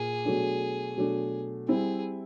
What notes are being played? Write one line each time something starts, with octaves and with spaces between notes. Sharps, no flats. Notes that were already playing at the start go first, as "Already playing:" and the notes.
Already playing: A#2 A#3 G#4
B2 F#3 A3 D4
B2 F#3 A3 D4
G3 C4 E4 G#4